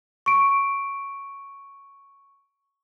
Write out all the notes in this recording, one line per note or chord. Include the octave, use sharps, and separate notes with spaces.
C#6 D7